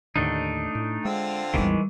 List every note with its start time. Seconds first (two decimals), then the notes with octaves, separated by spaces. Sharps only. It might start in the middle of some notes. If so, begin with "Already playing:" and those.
0.16 D#2 A2 D3 A3 D4 D#4
0.75 A2
1.05 D3 G#3 C4 F4
1.54 A1 E2 D#3 E3 G3 G#3 D#4